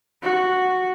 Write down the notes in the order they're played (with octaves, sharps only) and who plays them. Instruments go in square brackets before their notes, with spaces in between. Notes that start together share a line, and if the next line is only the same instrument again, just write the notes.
[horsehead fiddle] F#4